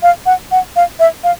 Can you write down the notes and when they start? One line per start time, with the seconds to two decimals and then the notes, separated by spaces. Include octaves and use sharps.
0.03 F5
0.26 F#5
0.51 F#5
0.76 F5
1.00 E5
1.24 F5